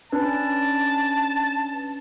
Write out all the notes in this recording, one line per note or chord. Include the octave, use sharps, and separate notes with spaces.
C#4 D4 B4 A5